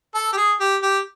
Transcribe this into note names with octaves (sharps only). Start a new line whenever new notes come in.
A4
G4
G#4
G4
G4